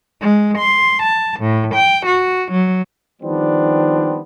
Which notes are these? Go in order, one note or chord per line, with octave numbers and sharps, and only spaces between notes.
G#3
C6
A5
A2
G5
F#4
F#3
D#3 F3 G3 B3 C4 D4